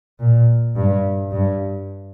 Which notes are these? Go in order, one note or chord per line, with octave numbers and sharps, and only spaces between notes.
A#2
G2
G2